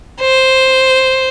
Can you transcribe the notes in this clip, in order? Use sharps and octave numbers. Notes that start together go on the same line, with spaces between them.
C5